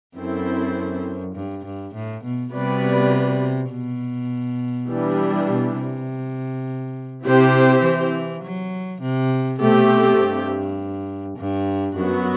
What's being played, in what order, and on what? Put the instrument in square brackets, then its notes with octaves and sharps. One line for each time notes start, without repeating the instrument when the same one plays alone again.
[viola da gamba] F#2 [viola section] C4 E4 A4 C5
[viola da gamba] G2
G2
A2
B2
[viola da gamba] C3 [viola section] G3 B3 F#4 B4 D5
[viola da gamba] B2
[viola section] E3 G3 D4
[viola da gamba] B2
C3
[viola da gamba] C3 [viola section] C4 E4 G4 C5
[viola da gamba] E3
F#3
C3
[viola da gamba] B2 [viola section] A3 C4 G4
[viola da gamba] G2
G2
[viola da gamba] F#2 [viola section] F#3 B3 F#4